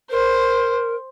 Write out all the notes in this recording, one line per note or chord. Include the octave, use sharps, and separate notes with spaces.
A#4 C5